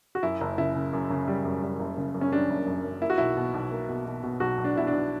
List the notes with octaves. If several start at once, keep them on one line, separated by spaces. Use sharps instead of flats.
F#4
F#2 E4
F#1
C#3 E4
C#3
F#2
C#3
G3
F#2
G3
F#1
C#3
F#2
C#4
G3 D4
F#1
F#2
F#2
A#3 E4
F#4
B1 E4
B2
B1
A#3
B2
B2
B2
B1 F#4
B1
D4
B2 E4
D4
B1